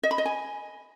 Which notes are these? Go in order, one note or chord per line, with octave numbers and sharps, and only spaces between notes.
D#5
B5
D#5
G#5